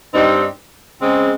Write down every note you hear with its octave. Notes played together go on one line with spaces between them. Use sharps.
G2 G3 C4 D#4
C#3 G#3 C4